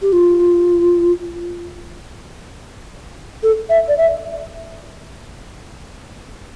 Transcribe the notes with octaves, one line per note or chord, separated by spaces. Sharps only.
G4
F4
A4
E5
D5
E5